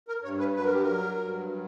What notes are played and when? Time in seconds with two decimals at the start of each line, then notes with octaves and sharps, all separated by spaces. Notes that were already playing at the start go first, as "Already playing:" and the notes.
0.08 A#4
0.23 G2 C#5
0.39 B4
0.55 F#3 B4
0.64 A#4
0.73 G4
0.83 F#3 A#4
1.17 G2
1.48 F#3